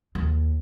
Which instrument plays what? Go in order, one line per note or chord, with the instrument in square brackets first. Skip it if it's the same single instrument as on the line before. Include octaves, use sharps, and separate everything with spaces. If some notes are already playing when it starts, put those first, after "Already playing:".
[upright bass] D#2